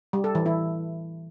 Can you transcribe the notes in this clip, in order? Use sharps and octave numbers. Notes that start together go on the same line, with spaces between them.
G3
A4
E3
E4